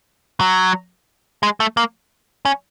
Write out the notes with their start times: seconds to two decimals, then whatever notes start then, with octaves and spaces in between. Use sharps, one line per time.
0.41 F#3
1.43 G#3
1.60 A3
1.77 A#3
2.45 C#4